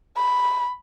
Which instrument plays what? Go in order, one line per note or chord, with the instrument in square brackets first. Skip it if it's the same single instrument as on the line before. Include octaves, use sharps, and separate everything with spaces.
[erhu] B5